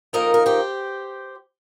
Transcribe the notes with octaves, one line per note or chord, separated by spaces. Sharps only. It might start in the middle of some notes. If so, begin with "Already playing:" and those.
F2 D#3 A#3 D#4 A#4 D#5
A#4
G4 C5